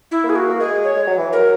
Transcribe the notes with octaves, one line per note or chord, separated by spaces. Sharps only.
E4
A#3
G#4
F#4
A#3
G#3 G#4
C#5
G#3
F#3
E3
F#3 A#4